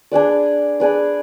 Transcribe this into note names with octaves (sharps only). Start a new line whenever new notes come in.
D4 G#4 B4 D5
D4 G#4 B4 D5